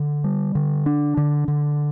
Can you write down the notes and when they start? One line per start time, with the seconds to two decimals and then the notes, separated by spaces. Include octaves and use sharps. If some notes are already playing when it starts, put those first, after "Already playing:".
Already playing: D3
0.24 G3
0.55 D3
0.86 D4
1.17 D3
1.48 D3